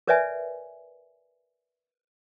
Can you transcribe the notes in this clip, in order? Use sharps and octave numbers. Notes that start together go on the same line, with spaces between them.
A#4 B4 C#5 D5 E5 G#5